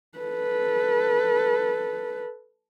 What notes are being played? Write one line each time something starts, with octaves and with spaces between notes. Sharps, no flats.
A4 B4